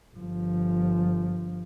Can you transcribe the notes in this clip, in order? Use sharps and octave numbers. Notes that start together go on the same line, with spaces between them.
G1 F3